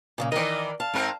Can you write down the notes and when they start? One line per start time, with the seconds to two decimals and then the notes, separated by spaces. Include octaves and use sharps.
0.18 A#2 C#3 A#3
0.32 D#3 E3 A#4 D5 D#5
0.80 F5 A5
0.94 G#2 C4 A#4